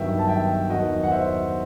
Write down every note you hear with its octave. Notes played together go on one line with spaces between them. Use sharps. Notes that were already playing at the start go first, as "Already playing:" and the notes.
Already playing: G2 D#3 F#3 B3 E5 G5
A5
E5 G5
E2 D#3 F#3 D#5 F#5
F#5
C5 E5